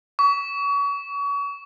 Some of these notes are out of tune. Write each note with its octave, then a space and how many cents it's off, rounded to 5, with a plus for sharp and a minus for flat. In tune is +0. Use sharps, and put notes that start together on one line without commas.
C#6 +35